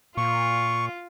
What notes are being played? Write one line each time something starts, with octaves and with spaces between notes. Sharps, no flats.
A#2 F4 C#6